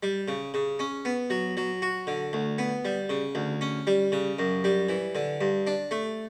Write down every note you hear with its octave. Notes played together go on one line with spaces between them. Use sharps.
G3
C#3
C#3
C#4
B3
F#3
F#3
F#4
D3
D2
B3
G3
C#3
D2
C#4
G3
C#3
F#2
G3
E3
D3
G2
D4
A3